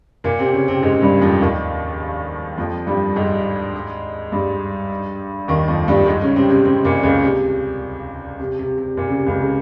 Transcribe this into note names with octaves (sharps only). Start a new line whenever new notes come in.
A#2 A#3
C3 C4
C#3 C#4
C3 C4
G#2 G#3
G2 G3
F2 F3
D#2 D#3
F2 F3
G2 G3
G#2 G#3
G2 G3
D#2 D#3
F2 F3
G2 G3
G#2 G#3
C#3 C#4
C3 C4
C3 C4
C3 C4
A#2 A#3
C#2 C#3
C3
C3
C3
C3
A#2
C#3
C3
C#2 C#3
C#3